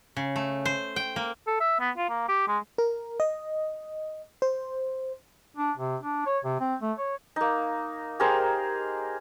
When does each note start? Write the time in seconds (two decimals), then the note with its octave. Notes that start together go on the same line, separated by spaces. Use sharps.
0.17 C#3
0.36 A3
0.65 C5
0.96 G5
1.16 A#3
1.47 A4
1.60 E5
1.80 B3
1.97 F4
2.09 A#3
2.29 G4
2.48 G#3
2.78 A#4
3.20 D#5
4.42 C5
5.57 D4
5.77 C3
6.01 D4
6.26 C#5
6.45 C3
6.60 C4
6.81 A3
6.98 C#5
7.36 A#3 D#4
8.19 G4 G#4 A#4 C5